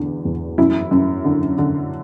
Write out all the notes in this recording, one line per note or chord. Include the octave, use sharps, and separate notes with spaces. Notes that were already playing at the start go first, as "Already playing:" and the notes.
Already playing: E2 D3
E2
F#2 E4
F#2
D3
D3